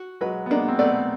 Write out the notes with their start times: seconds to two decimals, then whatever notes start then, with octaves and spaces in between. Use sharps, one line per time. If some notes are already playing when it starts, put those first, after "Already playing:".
Already playing: F#4
0.21 F#3 G#3 B4
0.46 B3
0.50 G#3 A#3 D4
0.68 C4
0.79 A3 B3 D5